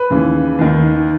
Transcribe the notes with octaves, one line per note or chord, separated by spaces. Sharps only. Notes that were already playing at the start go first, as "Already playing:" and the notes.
Already playing: B4
D#2 C#3 E3
D#2 D#3